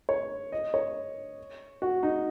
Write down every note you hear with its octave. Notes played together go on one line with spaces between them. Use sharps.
C#5
D#5
C#5
F#4
D#4